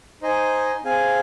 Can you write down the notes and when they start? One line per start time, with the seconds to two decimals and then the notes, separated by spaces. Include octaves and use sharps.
0.22 D#4 C5 D#5 G#5
0.84 C4 G#4 F5 G#5